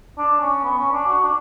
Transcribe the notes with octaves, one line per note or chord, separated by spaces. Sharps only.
D4
C#4
B3
C#4
D4
F#4
D4